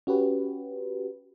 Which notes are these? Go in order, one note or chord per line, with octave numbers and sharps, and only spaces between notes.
C#4 F#4 G4 B4